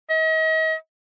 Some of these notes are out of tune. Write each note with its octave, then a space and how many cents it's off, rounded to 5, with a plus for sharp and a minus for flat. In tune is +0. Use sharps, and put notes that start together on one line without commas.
D#5 +40